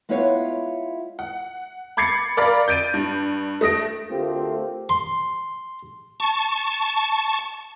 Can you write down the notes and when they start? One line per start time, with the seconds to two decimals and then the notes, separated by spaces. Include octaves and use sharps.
0.09 G#3 B3 E4 F4 C#5 F5
1.19 F#5
1.97 B5 D6 G#6 A6 C7 C#7
2.37 A#4 D5 F5 B5 A6
2.68 G6 A6 D7 D#7
2.94 G2
3.61 A3 D#6 A#6 D7
4.10 D2 A3 C4 F4 G4 A#4
4.89 C6
6.20 A5 C#6